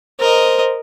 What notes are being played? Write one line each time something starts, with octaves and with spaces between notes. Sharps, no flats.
A#4 C5 D#5